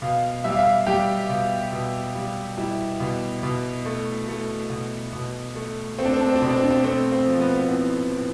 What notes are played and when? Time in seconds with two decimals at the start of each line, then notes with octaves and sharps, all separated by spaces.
0.02 B2 F5
0.44 G3 E5
0.52 F5
0.59 E5
0.87 G3 G4
1.29 B2
1.72 B2
2.15 G3
2.57 G3 E4
3.00 B2
3.43 B2
3.86 A3
4.28 A3
4.70 B2
5.13 B2
5.56 A3
5.98 A3 C4
6.05 D4
6.13 C4
6.21 D4
6.28 C4
6.35 D4
6.42 B2 C4
6.50 D4
6.56 C4
6.63 D4
6.71 C4
6.84 A3 C4
7.12 C4
7.26 F3
7.40 B3
7.58 B3
7.68 A2 C4
8.11 A2